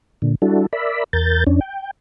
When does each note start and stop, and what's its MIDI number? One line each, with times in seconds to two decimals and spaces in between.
0.22 0.35 46
0.22 0.35 50
0.42 0.66 55
0.42 0.66 62
0.42 0.66 64
0.42 0.66 66
0.42 0.66 69
0.73 1.04 70
0.73 1.04 74
0.73 1.04 76
0.73 1.04 83
1.13 1.44 40
1.13 1.44 70
1.13 1.44 91
1.13 1.44 93
1.47 1.60 41
1.47 1.60 61
1.47 1.60 62
1.61 1.91 79